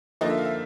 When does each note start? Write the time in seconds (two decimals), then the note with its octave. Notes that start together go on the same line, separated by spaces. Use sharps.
0.21 D3 F3 A#3 D#4 D#5
0.30 E5
0.38 F5
0.45 E5